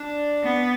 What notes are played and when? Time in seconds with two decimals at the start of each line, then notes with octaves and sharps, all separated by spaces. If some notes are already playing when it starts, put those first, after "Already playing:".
Already playing: D4
0.44 B3